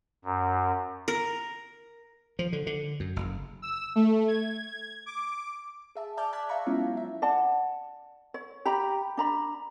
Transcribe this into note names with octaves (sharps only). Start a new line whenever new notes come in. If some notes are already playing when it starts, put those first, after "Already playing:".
F#2
A#4
F3
D3
D3
F#2
F#1
E6
A3
G#6
D6
G#4 E5 A5
D5 E5 A5 D6 F6 G6
A5 F#6 G#6 B6
E5 F5 A5 A#5 C#6
F#3 G#3 B3 C#4 E4 F4
F#3 E5
D5 F#5 A5
C#5
G4 G5 A#5 B5
D4 A#5 B5